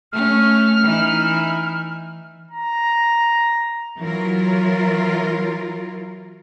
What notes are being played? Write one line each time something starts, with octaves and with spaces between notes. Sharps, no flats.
A3 C#4 F6
E3 D#4 E4
A#5
E3 F#3 E4 F4 A#4